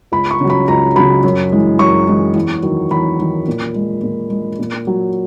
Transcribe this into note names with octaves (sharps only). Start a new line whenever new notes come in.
C#2 B5
C#6
C#3 F#3
B5
C#2 A#5
C#3 F#3 B5
F#2
E3 G#3
F#2 C#6
E3 G#3
E2
D#3 F#3
E2 B5
D#3 F#3
A#2
G#3
A#2
G#3
A#2
F#3